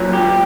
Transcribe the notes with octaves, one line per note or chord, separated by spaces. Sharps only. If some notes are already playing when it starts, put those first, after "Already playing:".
Already playing: A#2 F#3
G4